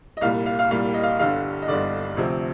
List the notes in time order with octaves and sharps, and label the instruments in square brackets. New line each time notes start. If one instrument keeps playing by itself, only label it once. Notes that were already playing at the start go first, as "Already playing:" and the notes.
[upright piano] D#5
C2 A#2 G3 F5
F5
F5
C2 A#2 G3 F5
D#5
F5
G1 G2 D3 F5
D#5
G1 G2 D3 D5
D2 C3 F3 C4